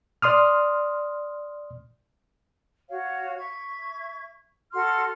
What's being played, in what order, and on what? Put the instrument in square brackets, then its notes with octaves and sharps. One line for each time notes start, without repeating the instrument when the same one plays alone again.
[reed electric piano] D5 C6 D#6 F6
[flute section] F#4 C#5 F5
E5 C#6 G#6
F#4 A4 C6 F6